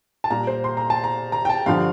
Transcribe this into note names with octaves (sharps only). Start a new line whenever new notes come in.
A5
A#2 G3 A#5
C5
C6
A#5
A5
A#5
A#5
G5
A5
G2 D3 F3 F5